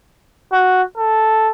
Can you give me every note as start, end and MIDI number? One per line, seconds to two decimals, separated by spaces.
0.52 0.82 66
0.97 1.51 69